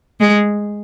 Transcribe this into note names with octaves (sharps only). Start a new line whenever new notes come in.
G#3